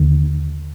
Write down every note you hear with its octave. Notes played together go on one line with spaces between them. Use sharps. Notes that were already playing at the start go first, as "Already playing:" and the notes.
Already playing: D#2 D3